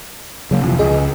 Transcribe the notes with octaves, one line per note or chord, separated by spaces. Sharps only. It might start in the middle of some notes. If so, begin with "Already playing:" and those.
C#3 F#3 A#3
F1 C3 E3 F3
C#2 G#4 D#5